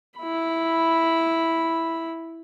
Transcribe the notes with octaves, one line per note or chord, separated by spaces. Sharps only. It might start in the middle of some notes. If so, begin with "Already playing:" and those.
E4 B5